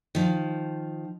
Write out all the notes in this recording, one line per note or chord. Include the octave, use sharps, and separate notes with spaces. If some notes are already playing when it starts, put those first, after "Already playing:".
D#3 F3